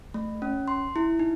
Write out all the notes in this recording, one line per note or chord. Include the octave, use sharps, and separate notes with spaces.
A3
C#4
C6
E4
D#4